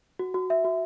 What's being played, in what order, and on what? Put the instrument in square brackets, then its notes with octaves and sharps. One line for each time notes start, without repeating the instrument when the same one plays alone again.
[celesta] F#4
F#4
E5
F#4